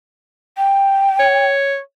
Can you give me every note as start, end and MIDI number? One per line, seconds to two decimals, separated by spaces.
0.57 1.50 79
1.19 1.79 73